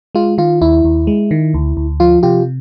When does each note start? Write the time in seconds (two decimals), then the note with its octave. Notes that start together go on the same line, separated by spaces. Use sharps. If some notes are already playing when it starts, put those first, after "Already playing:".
0.15 G#3 F4
0.38 D#3 F4
0.61 D#2 E4
0.85 D#2
1.07 G#3
1.31 D#3
1.54 D2
1.77 D2
2.00 F3 F4
2.23 C3 F4 G4